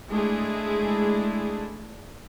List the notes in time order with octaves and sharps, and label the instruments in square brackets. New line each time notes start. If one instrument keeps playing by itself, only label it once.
[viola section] G#3 A3 D4 E4 G#4